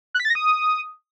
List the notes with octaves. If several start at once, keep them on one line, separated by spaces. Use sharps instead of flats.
F#6
B6
A6
A#6
D#6